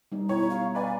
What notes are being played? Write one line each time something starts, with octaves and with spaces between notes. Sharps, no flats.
G3 D#4
B2 E4 C#5
F5
B4 D5 F5 G#5